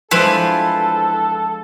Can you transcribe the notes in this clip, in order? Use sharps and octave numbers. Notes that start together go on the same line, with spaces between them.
F3 G#3 D4 E4 A4 B4 C5